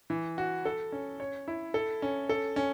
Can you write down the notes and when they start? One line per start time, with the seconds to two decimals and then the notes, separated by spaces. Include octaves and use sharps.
0.10 E3
0.38 F#4
0.65 A4
0.92 C#4
1.20 C#5
1.48 E4
1.74 A4
2.02 C#4
2.29 A4
2.56 C#4